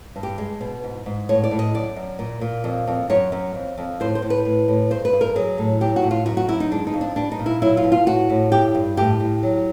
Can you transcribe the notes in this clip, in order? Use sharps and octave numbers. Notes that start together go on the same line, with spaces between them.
G2
G4
G#3
B2
G#2
G#2
A2 C#5
D5
A2
D#5
F#2 D5
F#2
A#2
A#2
F2
F2
F#2 C#5
F#2
F2
F2
A2 C5
C5
A2
B4
A2
A2
G2 C5
B4
G2
A#4
F#3 G#4
A2
F#3 G4
F#4
A2
F4
F#2 F#4
F#4
F#2 E4
D#4
G#3 D4
D#4
F2
D4
G3 D4
D#4
A#2
E4
F#3 E4
F4
B2
F4
A2 F#4
A2
G2 G4
G2
A2 G4
A2
F#3